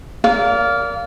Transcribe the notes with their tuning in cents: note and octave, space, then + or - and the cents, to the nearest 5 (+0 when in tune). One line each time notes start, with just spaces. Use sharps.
A#4 +0 D5 -30 F5 +0